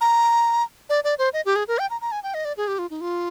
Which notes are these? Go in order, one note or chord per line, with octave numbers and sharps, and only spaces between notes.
A#5
D5
D5
C5
D#5
G4
G#4
A#4
G5
A#5
A#5
G#5
G5
D#5
D5
G#4
G4
F4
D#4
F4